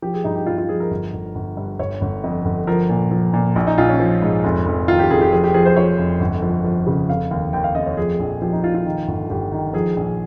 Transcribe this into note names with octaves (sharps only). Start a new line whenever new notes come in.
F3 G4
G#4
G2 D#4
G4
G2 F4
F4
F3 G#4
A#4
G1
G1
G1
G2
G1 C#5
G1
F2
G1
F3 A#4
A#2
F3
A#2
A#1
D#4
A#1 F4
C#4
F3
G#2
F1
F1
D#3 F4
G4
F1 G#4
G4
F3 G#4
G4
F3 G#4
C5
F3 C#5
F1
G1
F3
F3
C#3
F1 F5
D#2 F5
D#2 G5
F5
F1 D#5
C#5
F3 G#4
A#1
F3 G4
D#4
A#1 F4
F4
D#3
G1
G1 G4
D#3
F3 G#4
A#1